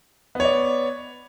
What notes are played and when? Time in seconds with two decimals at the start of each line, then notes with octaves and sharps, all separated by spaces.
0.35 B3
0.40 C#5
0.44 D5